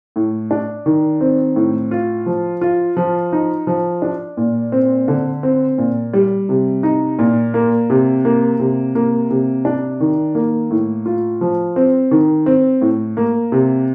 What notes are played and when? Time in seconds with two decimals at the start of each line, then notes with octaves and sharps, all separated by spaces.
0.16 A2
0.51 D4
0.86 D#3
1.21 C4
1.56 A2
1.91 F4
2.26 F3
2.61 F4
2.97 F3
3.32 D#4
3.67 F3
4.02 D4
4.37 A#2
4.72 C4
5.08 D3
5.43 C4
5.78 A#2
6.14 G3
6.49 C3
6.83 D#4
7.19 A#2
7.54 A#3
7.90 C3
8.25 A#3
8.59 C3
8.95 A#3
9.30 C3
9.65 D4
10.00 D#3
10.35 A#3
10.71 A2
11.06 F4
11.41 F3
11.76 C4
12.11 D#3
12.46 C4
12.81 A2
13.17 A#3
13.52 C3